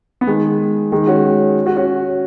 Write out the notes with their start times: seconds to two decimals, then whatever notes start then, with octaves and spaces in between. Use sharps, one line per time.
0.21 B3
0.27 D#3 G#3
0.92 D#3 G#3
1.07 C#4 F#4
1.66 C#4 F#4
1.77 C#4 F#4